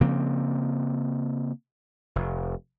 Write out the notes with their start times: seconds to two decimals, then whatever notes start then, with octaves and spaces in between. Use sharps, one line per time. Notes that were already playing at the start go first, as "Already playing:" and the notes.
0.01 C#3 F3 A#3 C4
2.16 F1